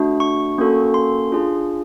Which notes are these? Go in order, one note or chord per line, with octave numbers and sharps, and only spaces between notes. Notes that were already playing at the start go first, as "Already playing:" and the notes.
Already playing: A3 D4 F#4
C#6
A#3 C#4 F#4 A4
C6
D4 F4 G#4